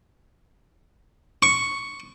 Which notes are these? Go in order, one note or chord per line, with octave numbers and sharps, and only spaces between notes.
C#6